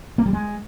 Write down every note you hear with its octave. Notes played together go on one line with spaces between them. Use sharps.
A#3
G3
G#3